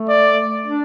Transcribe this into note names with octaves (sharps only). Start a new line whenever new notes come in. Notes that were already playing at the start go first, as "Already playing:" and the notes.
Already playing: A3
D5
D4